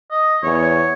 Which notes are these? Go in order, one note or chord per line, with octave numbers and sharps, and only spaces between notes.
D#5
E2 C#5